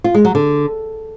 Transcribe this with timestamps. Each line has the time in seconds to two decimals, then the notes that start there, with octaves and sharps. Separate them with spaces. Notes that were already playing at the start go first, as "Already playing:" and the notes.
0.04 F4
0.15 G#3
0.25 F#3
0.35 D3